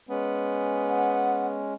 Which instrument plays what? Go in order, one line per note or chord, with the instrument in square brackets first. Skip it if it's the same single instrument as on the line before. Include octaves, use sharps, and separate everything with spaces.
[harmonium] G#3 C#4 [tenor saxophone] B3
[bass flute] F#5